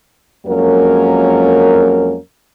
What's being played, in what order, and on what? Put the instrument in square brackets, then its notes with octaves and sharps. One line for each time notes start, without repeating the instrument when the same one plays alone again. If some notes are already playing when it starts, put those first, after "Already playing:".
[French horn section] F2 F#3 G#3 A#3 C#4 A#4